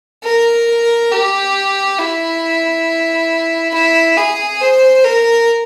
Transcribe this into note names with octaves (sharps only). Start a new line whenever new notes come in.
A#4
G4
E4
E4
G#4
C5
A#4